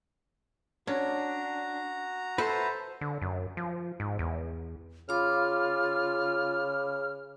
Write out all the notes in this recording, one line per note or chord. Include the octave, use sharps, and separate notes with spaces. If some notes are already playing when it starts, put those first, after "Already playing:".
C#4 D4 F#4 A#5
A4 B4 C5 E5 C6
D3
F#2
F3
G#2
E2
C#3 F4 F5 B5 D6 F6